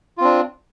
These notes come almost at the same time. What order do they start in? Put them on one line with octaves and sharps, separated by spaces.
F4 C4 D4